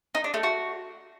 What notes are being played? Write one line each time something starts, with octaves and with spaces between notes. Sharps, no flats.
D#4
D4
A3
F#4